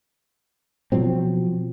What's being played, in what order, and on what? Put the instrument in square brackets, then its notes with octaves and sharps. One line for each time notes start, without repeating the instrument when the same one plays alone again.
[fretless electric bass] B2 F3 F#3 C4